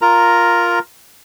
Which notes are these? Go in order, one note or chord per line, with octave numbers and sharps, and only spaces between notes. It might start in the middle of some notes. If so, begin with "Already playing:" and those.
F4 A#4 A#5